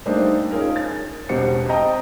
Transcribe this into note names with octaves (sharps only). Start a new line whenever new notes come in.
G3 A3 A#3 D4 D#4 C5
C#4 D#4 F4 G#4 A#4
A6
E1 B2 F#4 G4 C5 C#7
C4 D#5 G5 A5 A#5